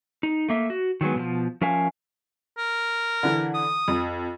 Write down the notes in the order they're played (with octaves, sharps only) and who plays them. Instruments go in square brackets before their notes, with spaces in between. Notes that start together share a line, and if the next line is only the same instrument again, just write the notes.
[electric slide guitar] D#4
A3 A#3 E5
F#4
D#3 F#3 G#3 B3
B2 D#3 F3
F3 C#4 A#4 E5 F5 G#5
[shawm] A#4
[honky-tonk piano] D3 E3
[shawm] D#6
[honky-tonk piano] F2